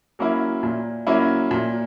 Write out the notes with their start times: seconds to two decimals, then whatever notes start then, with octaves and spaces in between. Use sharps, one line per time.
0.19 F#3 A#3 C#4 E4
0.63 A#2
1.07 F#3 A#3 C#4 E4
1.51 A#2